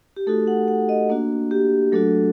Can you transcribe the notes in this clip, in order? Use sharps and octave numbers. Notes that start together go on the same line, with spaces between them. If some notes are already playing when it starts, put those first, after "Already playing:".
G4
A3 D#4 F#4 A4
F#5
F#5
D#5
A#3 D4 F#4
G4
F#3 A3 D4 F#4 A4